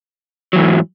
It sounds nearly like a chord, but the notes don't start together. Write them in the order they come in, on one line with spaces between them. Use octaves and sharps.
F#3 E3 G#2